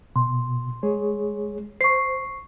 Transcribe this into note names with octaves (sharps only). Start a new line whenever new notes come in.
B2 C6
G#3 G#4 C#5
C5 C#6 C7